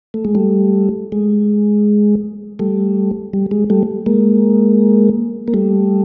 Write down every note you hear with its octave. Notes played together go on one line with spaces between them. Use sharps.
A3
G#3
G3 A3
G#3
G3 A3
G3
G#3
G3 A3
G#3 A#3
A#3
G3 A3